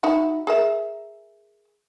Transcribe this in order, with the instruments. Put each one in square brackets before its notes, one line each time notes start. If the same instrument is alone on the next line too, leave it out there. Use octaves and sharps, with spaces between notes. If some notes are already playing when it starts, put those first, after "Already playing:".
[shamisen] D#4 E4 F#4
G#4 A#4 E5